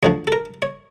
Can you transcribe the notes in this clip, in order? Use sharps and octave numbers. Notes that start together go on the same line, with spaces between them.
D2 D3 F3 C#5
A4
A#4
C#5